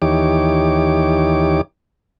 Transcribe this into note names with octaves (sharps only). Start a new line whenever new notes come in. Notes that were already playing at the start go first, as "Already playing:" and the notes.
D#2 E3 D#4 G4 C#5 D6